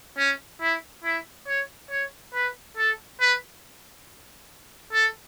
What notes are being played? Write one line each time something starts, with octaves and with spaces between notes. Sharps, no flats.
C#4
E4
E4
C#5
C#5
B4
A4
B4
A4